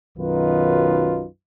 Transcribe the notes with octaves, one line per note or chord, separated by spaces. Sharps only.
B1 F#2 D#3 D#4 F4 B4